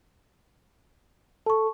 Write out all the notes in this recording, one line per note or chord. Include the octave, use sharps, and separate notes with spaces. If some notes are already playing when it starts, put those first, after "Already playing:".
A4 A5 C#6